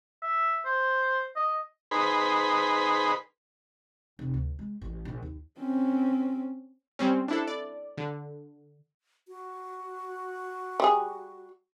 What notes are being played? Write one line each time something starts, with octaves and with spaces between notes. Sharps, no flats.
E5
C5
D#5
D#4 G#4 B4 C5 B5
F1
D2
G#3
A1
A#1
D#2
C4 C#4
G3 C4 C#4
D4 E4 A4
D5
D3
F#4
G3 G#4